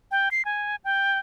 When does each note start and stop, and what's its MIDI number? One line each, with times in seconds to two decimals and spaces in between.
0.11 0.29 79
0.31 0.45 96
0.45 0.76 80
0.84 1.19 79